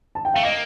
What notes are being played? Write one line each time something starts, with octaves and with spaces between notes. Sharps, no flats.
A5
G5
A3 F5
A#3 D#5